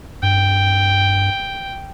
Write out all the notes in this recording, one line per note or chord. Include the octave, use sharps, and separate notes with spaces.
G2 G5